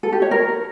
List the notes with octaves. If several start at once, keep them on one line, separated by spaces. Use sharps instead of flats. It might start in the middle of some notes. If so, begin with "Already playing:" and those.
A4
G4
C#5
A#4